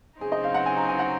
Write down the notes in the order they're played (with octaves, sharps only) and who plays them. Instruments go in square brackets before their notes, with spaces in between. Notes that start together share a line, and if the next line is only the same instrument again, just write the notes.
[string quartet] C#3 F#3 C4 D#4 [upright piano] G#4
[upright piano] D#5
F5
F#5
G#5
A#5
G#5
F#5